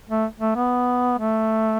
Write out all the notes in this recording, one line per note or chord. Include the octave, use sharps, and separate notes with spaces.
A3
A3
B3
A3